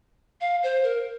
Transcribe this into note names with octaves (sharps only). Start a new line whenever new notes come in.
F5
C5
A#4